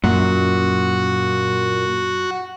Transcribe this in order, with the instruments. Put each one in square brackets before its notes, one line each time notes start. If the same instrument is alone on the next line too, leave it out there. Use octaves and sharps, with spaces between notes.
[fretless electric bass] F#2 [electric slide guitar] A#2 [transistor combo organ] F#4